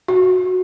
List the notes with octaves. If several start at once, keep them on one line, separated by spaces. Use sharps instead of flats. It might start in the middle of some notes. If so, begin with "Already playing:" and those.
F#4